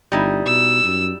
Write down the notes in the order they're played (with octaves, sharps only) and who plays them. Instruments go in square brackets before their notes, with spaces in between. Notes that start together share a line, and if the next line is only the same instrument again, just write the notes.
[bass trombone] G1 [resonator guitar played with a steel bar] G3 D#4 E4
[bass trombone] B2 [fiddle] E6
[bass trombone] F#2